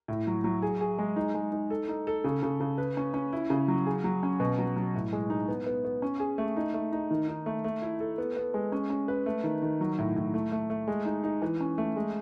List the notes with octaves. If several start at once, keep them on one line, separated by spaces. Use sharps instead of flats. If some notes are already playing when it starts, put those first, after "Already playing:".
A2
F#3
F#3
G#4
G#4
G#3
D#4
G#3
D#4
A4
D#4
A4
C#3
C#3
C#3
B4
C#4
C#4
E4
C#3
F#3
G#4
F#3
C#4
B2
F#3
F#3
A2
G#3
D#4
B3
B3
B3
C#4
G#4
A3
D#4
A3
D#4
D#3
D#4
A3
A3
E4
A4
B3
B3
G#3
C#4
C#4
B4
A3
D#3
D#3
F#3
A2
A2
A3
A3
A3
G#3
D#4
D#4
E3
C#4
A3
G#3